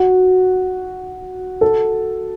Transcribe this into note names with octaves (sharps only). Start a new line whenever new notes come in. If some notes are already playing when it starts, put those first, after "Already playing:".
Already playing: F#4
A4